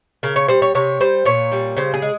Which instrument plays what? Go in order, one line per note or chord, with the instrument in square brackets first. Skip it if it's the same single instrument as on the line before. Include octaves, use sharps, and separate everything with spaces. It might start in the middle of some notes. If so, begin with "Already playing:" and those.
[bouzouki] C#3 A#4
C#5
G3 C5
C#5
C3 C#5
G3 C5
A#2 C#5
G3
C#3 C5
G#4
G#3